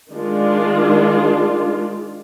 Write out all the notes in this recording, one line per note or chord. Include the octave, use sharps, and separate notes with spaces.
D#3 G#3 D4 F4